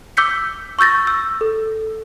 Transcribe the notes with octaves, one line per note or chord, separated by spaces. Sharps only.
D6 E6 G6 B6 C#7
C#6 E6 G6 A6 A#6
E6
A4